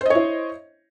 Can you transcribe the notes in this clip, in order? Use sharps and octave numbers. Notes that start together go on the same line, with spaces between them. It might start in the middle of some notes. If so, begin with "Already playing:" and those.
E4 C5 C#5 D#5